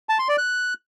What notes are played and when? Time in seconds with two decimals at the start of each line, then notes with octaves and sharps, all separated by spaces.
0.09 A5
0.19 C6
0.28 D5
0.38 F#6